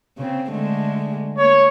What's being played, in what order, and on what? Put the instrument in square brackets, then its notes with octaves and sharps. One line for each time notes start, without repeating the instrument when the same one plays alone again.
[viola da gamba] C#3 C4
D3 G#3 A3
[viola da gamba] A#3 [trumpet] C#5